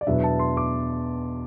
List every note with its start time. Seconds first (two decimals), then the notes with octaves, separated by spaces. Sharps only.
0.01 D5
0.07 E2 B2 F#3 B3 D4 E5
0.23 A5
0.39 C6
0.57 D6